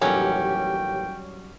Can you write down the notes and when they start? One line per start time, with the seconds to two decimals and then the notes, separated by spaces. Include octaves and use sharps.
0.02 A1 D#2 F#3 G3 C#4 G5